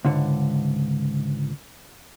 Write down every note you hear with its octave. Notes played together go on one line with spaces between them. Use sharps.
C#2 G#2 D3